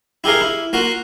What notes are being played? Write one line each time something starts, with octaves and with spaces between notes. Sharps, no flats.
E4 G4 G#4 A#4 F5
E4
A#3 F4 F#4